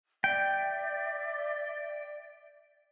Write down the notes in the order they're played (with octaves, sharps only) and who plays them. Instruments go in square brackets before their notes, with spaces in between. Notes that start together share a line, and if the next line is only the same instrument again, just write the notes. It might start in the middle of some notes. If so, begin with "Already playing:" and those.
[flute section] D5 E5 [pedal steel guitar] G5